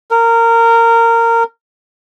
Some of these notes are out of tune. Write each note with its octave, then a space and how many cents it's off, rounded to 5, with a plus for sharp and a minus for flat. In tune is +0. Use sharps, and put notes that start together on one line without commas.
A#4 -20